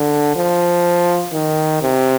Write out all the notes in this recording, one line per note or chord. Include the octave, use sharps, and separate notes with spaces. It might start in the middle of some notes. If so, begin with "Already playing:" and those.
Already playing: D3
F3
D#3
C3